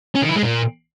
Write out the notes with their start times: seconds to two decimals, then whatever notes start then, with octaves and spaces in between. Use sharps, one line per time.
0.15 C#4
0.22 D#3
0.29 E4
0.36 G#3
0.43 A#2